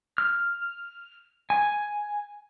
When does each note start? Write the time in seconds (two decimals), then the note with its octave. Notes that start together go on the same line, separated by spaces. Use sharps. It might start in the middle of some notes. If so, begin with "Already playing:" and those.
0.18 F6
1.50 G#5